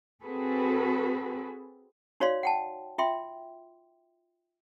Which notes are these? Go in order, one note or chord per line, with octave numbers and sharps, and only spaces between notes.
C4 F#4 G#4 A4 B4
D#4 F#4 C#5 D5 F5 C6
F#5 G5 A5
F4 E5 G5 C6